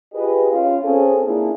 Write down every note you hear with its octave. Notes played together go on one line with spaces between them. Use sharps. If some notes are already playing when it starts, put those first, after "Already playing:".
F4 G4 G#4 B4 D#5
C#4 F4
C4 C#4 G#4 A4
A#3 D4 E4 F4 G#4